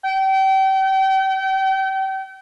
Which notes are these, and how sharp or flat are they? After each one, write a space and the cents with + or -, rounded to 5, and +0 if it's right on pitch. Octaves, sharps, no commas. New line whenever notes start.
G5 -35